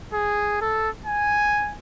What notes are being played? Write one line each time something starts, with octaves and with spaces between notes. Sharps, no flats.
G#4
A4
G#5